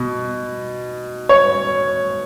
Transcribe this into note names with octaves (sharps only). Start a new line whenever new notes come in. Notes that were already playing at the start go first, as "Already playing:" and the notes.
Already playing: B2
C#5